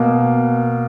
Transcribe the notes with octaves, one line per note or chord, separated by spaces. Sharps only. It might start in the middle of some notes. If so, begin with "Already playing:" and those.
Already playing: B2 A#3